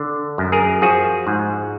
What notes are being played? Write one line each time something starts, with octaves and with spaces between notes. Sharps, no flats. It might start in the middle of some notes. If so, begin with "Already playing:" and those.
Already playing: D3
F#2
G#4 A#4
F3 F#4 G#4
G#2